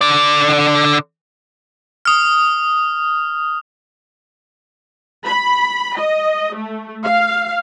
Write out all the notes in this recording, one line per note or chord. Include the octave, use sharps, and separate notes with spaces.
D3 D5
D#6 F6
B5
D#5
A3
F5